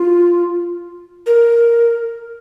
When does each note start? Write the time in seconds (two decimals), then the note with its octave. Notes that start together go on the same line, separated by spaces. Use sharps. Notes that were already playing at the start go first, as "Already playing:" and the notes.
Already playing: F4
1.26 A#4